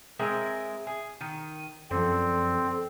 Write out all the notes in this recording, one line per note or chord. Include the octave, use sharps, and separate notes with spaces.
G#3 C4 A#4 E5 G#5
G#4
D#3 D#7
F#2 D3 F3 C4 A4